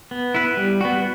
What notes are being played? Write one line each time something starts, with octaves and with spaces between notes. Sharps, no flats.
B3
E4 B4
G3
B3 F#4